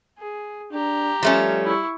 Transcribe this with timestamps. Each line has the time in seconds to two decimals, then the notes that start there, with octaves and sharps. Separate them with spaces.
0.19 G#4
0.72 D4 G4 A#5
1.23 F3 G3 A3 C#4
1.65 E4 C#6